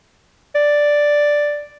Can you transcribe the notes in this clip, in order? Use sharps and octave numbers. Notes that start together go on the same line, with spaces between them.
D5